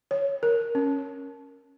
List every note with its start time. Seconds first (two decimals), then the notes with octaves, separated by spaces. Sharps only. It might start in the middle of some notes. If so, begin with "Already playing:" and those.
0.11 C#5
0.43 A#4
0.75 C#4